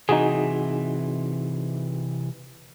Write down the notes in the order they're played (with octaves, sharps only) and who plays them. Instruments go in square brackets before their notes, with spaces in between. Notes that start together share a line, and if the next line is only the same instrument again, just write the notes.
[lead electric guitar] C3 E3 [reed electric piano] D#4 F#4 G#4